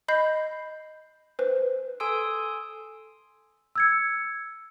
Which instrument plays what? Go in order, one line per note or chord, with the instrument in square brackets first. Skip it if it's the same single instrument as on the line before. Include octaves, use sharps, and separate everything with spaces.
[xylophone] D#5 B5 G6 C7
B4 C5
[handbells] A4 G#5 C6 D#6 E6 D7
[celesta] E6 G#6 C#7